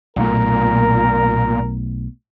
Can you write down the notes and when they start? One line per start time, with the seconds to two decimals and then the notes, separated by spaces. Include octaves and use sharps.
0.16 B1 A#2 A3 A#4